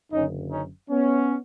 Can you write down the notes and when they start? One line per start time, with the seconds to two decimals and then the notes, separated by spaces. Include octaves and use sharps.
0.12 F#1 F#2 D3 C#4 D#4
0.51 C#4 D#4
0.90 B3 C#4